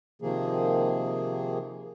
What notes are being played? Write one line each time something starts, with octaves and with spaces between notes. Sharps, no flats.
C3 D#3 F3 A#3 G#4